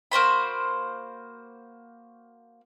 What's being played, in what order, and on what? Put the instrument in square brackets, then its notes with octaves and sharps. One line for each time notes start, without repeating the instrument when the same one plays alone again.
[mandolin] A#3 F#4 C5 B5